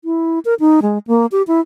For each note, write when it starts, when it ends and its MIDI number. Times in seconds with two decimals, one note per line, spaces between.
0.05 0.39 64
0.45 0.54 70
0.60 0.80 63
0.82 0.98 56
1.07 1.26 58
1.32 1.42 67
1.48 1.61 64